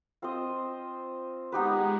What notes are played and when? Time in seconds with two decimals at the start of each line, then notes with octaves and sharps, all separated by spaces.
0.22 C4 F4 C5 D#5
1.52 G#3 B3 D#4 G4 B4